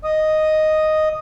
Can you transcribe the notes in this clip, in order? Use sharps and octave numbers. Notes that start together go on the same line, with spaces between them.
D#5 D#6